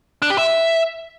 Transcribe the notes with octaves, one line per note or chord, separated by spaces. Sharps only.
D4
G4
E5